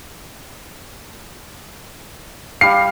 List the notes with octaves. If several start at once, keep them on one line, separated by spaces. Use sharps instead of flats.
G3 F5 C7